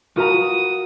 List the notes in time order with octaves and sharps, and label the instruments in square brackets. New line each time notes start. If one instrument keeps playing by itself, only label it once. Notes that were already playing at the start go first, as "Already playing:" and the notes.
[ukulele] F4 B4 A#5 [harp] F#4 A#4 F#5 [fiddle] D#6